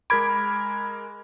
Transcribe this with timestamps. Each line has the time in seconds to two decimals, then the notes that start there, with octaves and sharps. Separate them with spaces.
0.10 G#3 A#4 B5 D6 F6 G#6 D7